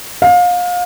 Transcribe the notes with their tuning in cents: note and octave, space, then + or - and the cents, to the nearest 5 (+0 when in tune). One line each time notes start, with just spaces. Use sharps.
F5 +30